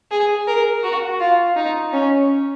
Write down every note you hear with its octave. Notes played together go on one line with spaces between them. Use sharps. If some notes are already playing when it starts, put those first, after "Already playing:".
G#4
A#4
F#4
F4
D#4
C#4